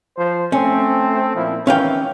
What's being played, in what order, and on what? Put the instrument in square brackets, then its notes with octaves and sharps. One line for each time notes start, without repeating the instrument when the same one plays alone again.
[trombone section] F3 C5
[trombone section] A3 C4 [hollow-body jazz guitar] C#4
[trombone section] A#2 F3 E4
[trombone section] G#2 D#3 E3 [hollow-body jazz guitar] C#4 F5 G5